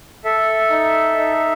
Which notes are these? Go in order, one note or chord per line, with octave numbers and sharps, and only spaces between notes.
A4 E5
D#4
D#4